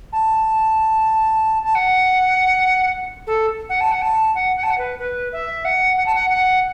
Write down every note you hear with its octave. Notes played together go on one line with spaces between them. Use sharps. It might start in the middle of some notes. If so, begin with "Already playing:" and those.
A5
A5
F#5
A4
F#5
A5
F#5
A5
F#5
F#5
A5
F#5
B4
B4
E5
F#5
F#5
A5
F#5
F#5